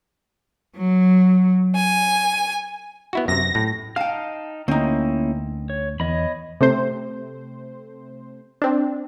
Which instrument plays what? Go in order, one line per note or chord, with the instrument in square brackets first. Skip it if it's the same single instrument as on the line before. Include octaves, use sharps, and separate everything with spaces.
[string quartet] F#3
G#5
[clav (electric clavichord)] B3 E4 F#4
[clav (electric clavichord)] F#2 C3 [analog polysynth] A#6
[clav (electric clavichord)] A2
[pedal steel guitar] D#4 A5 F6 [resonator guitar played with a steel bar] F5 G5
[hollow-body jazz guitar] D2 [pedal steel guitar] A#3 C#4 E4 [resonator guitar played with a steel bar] C4 D#4
[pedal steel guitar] C#5
[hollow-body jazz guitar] E2 [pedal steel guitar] C#5 D#5 B5
[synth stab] C3 A3 C4 C5
C4 D4